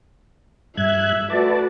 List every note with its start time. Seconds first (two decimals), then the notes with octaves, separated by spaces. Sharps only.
0.77 G2 E5 F#6 G#6
1.30 A3 F#4 B4 D5 A5